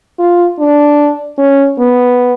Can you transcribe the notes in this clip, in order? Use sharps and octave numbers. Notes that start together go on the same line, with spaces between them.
F4
D4
C#4
B3